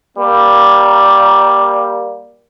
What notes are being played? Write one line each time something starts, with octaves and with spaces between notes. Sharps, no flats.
G3 A#3